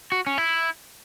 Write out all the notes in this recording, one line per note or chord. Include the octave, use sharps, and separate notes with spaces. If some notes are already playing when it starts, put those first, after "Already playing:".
F#4
C#4
E4